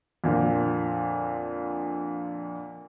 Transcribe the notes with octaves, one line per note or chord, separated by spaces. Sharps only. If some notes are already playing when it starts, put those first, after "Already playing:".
F2 A#2 D3